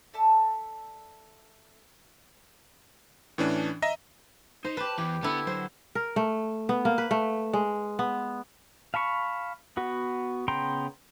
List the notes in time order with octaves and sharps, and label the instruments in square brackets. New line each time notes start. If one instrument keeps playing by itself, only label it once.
[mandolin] A4 D5 E5 A5
[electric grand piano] A2 E3 C#4 D4
D#5 E5 A#5 A#6
[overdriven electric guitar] D#4 [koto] C5
[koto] G4 B4 [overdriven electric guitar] A5
[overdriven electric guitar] E2 E3 [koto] G4
[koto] D3 E4 [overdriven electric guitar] B3
[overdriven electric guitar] F#3 [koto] C5
[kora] A#4
A3
B3
A#3
B4
A3
G#3
B3
[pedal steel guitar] F5 A5 B5 C#6
B3 F#4
C#3 B3 G5 A#5 C6